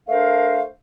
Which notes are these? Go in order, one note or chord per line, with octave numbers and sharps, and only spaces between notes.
A3 D4 A#4 C5 F5